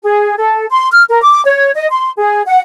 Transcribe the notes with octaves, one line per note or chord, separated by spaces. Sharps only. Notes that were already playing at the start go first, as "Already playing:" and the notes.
G#4
A4
C6
F6
A#4
D6
C#5
D#5
C6
G#4
F#5